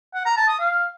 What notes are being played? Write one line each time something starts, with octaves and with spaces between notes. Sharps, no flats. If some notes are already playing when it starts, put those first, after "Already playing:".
F#5
A#5
A5
D#6
F5